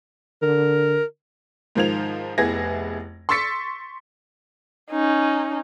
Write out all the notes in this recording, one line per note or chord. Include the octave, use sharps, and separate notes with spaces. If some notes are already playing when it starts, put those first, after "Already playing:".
D3 A#4
G#2 D#3 F3 G#6 F7
F1 B3 E4 G#4 G#6 A#6
C6 C#6 E6 A6 B6 C#7
C#4 D#4